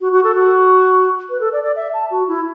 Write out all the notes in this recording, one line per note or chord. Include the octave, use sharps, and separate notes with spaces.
F#4
F#4
A4
F#4
B4
A4
D5
D5
E5
A5
F#4
E4